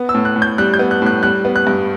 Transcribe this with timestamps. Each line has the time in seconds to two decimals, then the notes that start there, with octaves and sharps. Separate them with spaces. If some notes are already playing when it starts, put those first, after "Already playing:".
Already playing: B3
0.09 E6
0.14 A2
0.25 F#6
0.36 A2
0.42 G6
0.58 G3 F#6
0.73 G6
0.79 B3
0.91 F#6
1.02 A2 F#6
1.23 G3 F#6
1.45 B3
1.56 F#6
1.67 G2